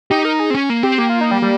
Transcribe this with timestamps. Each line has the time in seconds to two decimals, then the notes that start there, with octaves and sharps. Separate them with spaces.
0.10 D#4 G4
0.25 A#4
0.40 G#4
0.50 C4
0.54 C#4
0.70 A#3
0.83 C4 G4
0.98 A#3 G4
1.09 F4
1.21 D#4
1.31 G3
1.42 G3